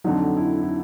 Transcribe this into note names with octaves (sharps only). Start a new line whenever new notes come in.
F2 D3 F#3 D#4
E4
E4